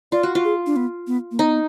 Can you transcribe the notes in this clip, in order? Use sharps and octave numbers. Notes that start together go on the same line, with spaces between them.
F4 D5
F#4
F4
G#4
D4
B3
B3
A#3
B3 D#4